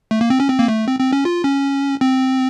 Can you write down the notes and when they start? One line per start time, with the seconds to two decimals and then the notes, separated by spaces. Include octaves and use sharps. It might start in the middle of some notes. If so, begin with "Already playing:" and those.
0.11 A3
0.21 A#3
0.30 C4
0.40 C#4
0.49 C4
0.59 A#3
0.68 A3
0.88 C4
1.00 C4
1.13 C#4
1.25 F4
1.44 C#4
2.01 C4